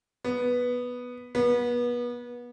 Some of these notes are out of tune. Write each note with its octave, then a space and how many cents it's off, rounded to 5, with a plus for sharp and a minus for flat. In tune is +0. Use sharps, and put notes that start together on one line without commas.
B3 -5
B3 -30